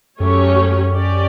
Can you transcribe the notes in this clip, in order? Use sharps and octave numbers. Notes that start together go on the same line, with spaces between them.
F#2 F#3 A3 C#4 G4 C#5
C#4 G4 D5